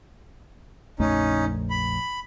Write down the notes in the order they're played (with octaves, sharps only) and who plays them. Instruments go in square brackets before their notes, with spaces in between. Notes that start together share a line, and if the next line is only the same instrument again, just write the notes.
[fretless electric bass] A#1 F2 A3 [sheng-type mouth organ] C#4 D#4
[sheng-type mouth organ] B5